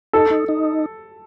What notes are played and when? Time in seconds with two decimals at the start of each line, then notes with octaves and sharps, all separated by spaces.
0.13 D#4 A4
0.31 D#4
0.49 D#4